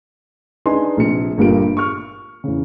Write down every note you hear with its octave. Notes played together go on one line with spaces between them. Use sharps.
D4 D#4 G#4 B4 G#5 C6
A#1 C3 C#7
G1 G2 A#2 A#3 G4 D7
C#6 F6
E2 C#3